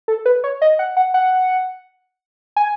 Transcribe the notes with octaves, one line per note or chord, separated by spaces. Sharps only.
A4
B4
C#5
D#5
F#5
F#5
F#5
G#5